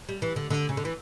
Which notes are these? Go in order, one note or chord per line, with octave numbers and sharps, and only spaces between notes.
G3
E3
D3
D3
C#3
D3
E3